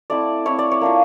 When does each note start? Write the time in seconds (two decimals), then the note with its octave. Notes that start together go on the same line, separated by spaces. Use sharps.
0.10 A3 C4 E4 D5
0.45 A3 C4 E4 C#5
0.59 D5
0.71 C#5
0.81 A#3 D4 F4